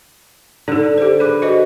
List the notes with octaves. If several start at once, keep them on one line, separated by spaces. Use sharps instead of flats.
D3 D#4 A4
G4 A4 C5
G#4 B4 D6
F#4 C5 D#5